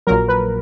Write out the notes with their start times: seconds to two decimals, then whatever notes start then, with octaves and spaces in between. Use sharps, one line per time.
0.07 A#1 A#2 F#3 A#4
0.28 B4